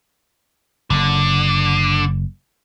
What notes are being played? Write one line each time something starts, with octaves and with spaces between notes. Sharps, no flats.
F#1 D3